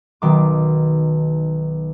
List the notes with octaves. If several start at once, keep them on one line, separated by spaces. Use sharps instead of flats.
B1 D#3 D6